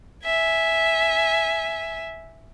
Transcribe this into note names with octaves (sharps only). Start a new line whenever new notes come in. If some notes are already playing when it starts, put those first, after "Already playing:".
E5 G#5